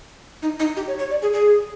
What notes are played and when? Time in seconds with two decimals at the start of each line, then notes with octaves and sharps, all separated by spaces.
0.42 D#4
0.59 D#4
0.77 G4
0.87 C#5
0.99 C#5
1.10 D5
1.22 G#4
1.34 G#4